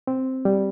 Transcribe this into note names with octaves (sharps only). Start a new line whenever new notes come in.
C4
G3